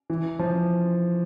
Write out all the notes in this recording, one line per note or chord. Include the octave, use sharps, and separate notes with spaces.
E3
F3